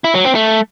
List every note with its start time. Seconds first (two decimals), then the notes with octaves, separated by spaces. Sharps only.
0.04 E4
0.15 F#3
0.25 C4
0.35 A3